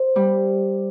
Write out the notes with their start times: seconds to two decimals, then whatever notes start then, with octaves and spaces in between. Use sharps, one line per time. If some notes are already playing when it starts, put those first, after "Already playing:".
Already playing: C5
0.16 G3